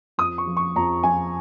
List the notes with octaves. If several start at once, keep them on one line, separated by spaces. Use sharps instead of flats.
F2 D#6
C#6
F3
C#6
F2 A#5
F3 G#5